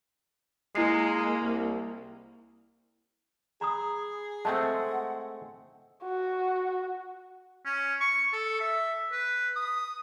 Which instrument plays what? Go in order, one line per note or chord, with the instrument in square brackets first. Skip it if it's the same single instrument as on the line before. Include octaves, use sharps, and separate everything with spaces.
[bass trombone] G#3 [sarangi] A#3 [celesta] E4 C7
[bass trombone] C2
[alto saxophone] G#4 [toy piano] A#5 B5 D#6
[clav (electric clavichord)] G#3 A3 C4 [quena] F#5 [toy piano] A5 E6
[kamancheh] F#4
[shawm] C#4
C#6
A4
E5
B4
D#6